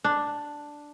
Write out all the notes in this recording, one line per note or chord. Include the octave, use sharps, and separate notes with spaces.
D4